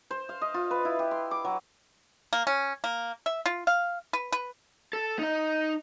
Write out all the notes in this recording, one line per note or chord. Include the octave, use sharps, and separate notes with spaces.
C5
F5
D#5
F4
B4
E4
G4
C6
D6
F#3
A#3
C#4
A#3
E5
F4
F5
B4
B4
A4
D#4 D#5